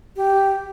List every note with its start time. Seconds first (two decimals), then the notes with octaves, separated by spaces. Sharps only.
0.17 G4